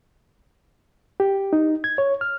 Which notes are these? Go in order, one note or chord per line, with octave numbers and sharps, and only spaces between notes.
G4
D#4
G#6
C#5
F6